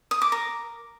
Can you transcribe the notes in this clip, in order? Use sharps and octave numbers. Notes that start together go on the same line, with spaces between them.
D#6
D6
A#4